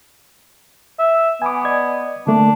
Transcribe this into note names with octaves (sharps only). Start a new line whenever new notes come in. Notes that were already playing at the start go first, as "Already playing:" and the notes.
E5
B3 G#5 D6
D5 D#5 G#6
D3 A3 A#3 D4